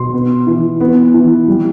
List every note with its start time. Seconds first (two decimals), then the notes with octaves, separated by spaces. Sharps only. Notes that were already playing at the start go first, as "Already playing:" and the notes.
Already playing: B2 C6
0.13 B3
0.47 E3
0.80 B3
1.14 E3
1.48 G3